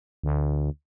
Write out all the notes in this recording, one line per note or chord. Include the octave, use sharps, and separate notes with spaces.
D2